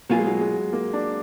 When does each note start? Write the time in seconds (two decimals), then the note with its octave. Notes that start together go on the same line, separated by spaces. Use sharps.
0.10 B2 F#3 A#3 F4 G#4
0.19 G#3
0.27 F#3
0.41 G#3
0.73 A#3
0.93 D4